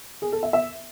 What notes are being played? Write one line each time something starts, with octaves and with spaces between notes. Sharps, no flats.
G#4
A4
E5
E5